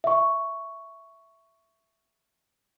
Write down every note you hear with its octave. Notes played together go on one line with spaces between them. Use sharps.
E5 C#6